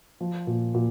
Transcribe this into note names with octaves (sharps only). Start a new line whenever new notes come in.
F3
A#2
A#2